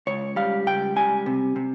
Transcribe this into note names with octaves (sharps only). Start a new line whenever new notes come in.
C#2 C#5
G3 F5
C#2 G5
G3 G#5
C3
C3